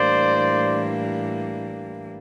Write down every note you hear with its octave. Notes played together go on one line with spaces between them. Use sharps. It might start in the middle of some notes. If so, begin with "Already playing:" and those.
Already playing: A2 E3 G3 A#3 D4 C5 D5